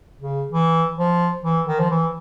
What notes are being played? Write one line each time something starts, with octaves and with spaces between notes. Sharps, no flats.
C#3
E3
F3
E3
D#3
F3
E3